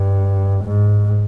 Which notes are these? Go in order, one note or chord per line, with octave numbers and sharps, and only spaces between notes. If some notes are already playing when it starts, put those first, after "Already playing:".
Already playing: G2
G#2